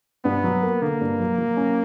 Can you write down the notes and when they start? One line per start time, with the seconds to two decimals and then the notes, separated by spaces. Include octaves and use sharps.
0.25 G2 B3
0.44 F#3
0.63 A#3
0.82 D3 A#3
1.01 G2
1.19 F#3
1.38 F#3
1.57 C#4